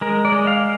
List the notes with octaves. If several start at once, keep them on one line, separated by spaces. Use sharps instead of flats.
G#3 A#4
D5
G#3
F5